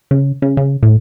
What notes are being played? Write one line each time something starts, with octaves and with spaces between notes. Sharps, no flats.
C#3
C#3
C#3
A2